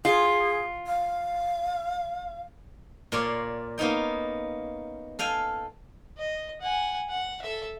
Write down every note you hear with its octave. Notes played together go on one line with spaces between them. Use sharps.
F4 G#4
F5
A#2 A#4 C#5 D5 F5 C6
A#3 B3 C#4 D#4 G5
A4 F5 G5 G#5
D#5
F#5 G#5
F#5
A4 E5